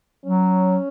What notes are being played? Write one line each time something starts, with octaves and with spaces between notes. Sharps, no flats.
F#3 C#4